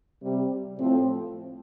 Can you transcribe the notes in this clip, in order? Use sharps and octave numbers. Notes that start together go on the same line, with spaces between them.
C3 G3 C4 G4
A2 F3 A3 C4